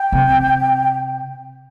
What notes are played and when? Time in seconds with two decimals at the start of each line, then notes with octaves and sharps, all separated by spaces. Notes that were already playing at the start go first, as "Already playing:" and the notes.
Already playing: G5
0.12 C3